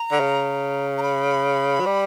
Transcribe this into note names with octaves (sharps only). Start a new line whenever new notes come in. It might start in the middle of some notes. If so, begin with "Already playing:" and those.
Already playing: A#5
D3
C#3
A#5
B5
F#3
G3